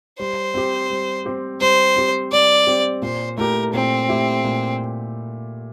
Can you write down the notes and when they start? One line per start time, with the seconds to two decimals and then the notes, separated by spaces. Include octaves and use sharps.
0.19 G3 C5
0.54 C4 G4
0.90 G3
1.26 C4 G4
1.61 G3 C5
1.96 C4 G4
2.32 G3 D5
2.67 C4 G4
3.02 A#2 C5
3.38 A3 E4 G4 A#4
3.73 A#2 C4
4.09 A3 E4 G4
4.44 A#2